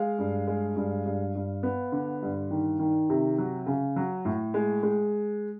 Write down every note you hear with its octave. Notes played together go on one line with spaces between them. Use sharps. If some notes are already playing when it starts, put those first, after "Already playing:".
Already playing: G#3 F5
G2
G#3
G2
G2
G2
B3
D3
G2
D#3
D#3
C3
F#3
C#3
F#3
A2
G#3
G#3